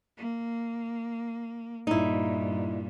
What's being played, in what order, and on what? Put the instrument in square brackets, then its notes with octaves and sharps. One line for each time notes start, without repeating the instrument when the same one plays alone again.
[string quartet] A#3
[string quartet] G2 A#2 [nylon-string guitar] D#4 E4